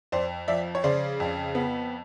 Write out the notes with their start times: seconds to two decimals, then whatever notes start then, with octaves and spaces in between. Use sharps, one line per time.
0.12 F2 C5 D5
0.48 F3 D5 E5
0.75 C#5
0.84 C#3 C5 D5
1.20 F2
1.55 B3